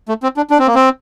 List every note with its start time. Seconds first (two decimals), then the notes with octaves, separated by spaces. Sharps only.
0.09 A3
0.23 C4
0.37 D4
0.50 D4
0.59 C4
0.67 A#3
0.75 C4